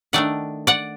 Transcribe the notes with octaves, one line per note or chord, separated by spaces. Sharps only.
D#3 A3 D4 D5 F#5
D5 F#5